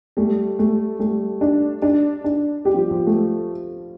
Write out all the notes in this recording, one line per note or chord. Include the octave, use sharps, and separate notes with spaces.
G3 A3
A3
G3 A3
D4
D4
D4
G3 G4
F3
F3
A3